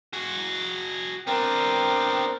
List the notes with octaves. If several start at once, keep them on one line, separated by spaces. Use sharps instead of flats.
F#4 G#4
B3 C4 D4 A#4 C5 G5